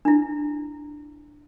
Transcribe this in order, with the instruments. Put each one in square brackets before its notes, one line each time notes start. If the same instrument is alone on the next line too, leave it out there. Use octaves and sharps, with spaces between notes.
[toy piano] D4 E4